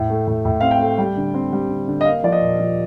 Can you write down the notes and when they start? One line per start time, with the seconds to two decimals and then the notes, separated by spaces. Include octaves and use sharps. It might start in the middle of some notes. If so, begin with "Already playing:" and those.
Already playing: A2
0.10 A3
0.27 A2
0.45 A2
0.61 C4 F5
0.71 G5
0.80 A3
0.98 G3
1.17 D3
1.34 C4
1.53 G3
1.70 D3
1.88 D3
2.01 D#5
2.05 A#3 F5
2.24 F3 D5
2.32 D#5
2.41 A#2
2.60 F3